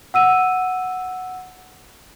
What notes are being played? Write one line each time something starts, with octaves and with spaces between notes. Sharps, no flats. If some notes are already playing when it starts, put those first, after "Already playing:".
F#5 E6 D#7